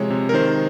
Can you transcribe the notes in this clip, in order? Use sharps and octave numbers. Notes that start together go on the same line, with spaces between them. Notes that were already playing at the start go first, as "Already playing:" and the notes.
Already playing: C3 F3 G#3 C#5
C3
A#4
D#3 C5